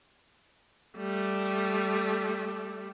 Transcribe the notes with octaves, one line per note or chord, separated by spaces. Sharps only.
G3 A3